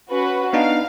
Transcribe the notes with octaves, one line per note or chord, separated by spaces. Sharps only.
C#4 F#4 B4
B3 D4 D#4 F5